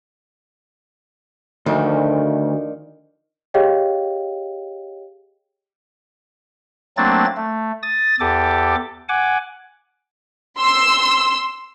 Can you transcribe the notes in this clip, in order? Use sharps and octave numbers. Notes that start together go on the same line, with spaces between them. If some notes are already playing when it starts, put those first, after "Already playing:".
D2 D#3 F3 D4
G4 G#4 C#5 D#5 F5 G5
F#3 A3 A#3 C4 D4 A6
A3
D#6 A6
E2 G4 A4 D6
F#5 G#5 D6
C6 E6